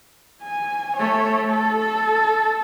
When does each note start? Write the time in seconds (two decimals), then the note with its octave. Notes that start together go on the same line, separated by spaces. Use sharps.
0.43 G#5
0.97 A3 C#5
1.48 A4
1.79 A4